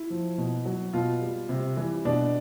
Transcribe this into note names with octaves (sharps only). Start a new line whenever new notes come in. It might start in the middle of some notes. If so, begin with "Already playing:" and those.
Already playing: E4
F3
B2
F#3
B2 F4
G3
C3
E3 G3
B2 D4